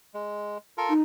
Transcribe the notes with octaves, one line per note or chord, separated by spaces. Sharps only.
G#3
F4 A4 A#4
D#4